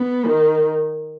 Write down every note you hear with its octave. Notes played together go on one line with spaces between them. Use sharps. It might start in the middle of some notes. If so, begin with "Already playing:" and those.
Already playing: B3
D#3